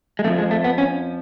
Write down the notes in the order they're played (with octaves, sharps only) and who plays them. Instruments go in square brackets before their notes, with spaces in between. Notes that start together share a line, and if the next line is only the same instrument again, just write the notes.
[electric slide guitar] G#3
F2 D3 F3 A3
G#3
A3
B3
C#4